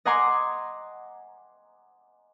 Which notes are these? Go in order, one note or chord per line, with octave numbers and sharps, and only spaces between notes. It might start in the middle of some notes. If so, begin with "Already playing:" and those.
D#5 F#5 G#5 A#5 C6 D6